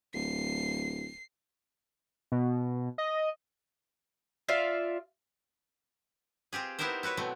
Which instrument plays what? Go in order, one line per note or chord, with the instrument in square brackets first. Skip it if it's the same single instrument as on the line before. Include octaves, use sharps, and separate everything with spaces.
[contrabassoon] D1 [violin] C7
[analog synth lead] B2
D#5
[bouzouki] F4 D5 E5 F5
[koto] C4 F4 G4 G#4
B3 D#4 E4 G4 A#4 C5
E4 F#4 B4 C#5
B2 F#3 A3 C4